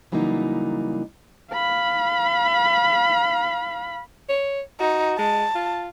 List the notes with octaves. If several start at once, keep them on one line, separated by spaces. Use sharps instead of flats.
C#3 E3 F#3 G3 A#3 D#4
F5 B5
C#5
D#4 F#4
G#3 A5
F4